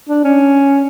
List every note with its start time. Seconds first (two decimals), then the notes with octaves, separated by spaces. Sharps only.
0.09 D4
0.24 C#4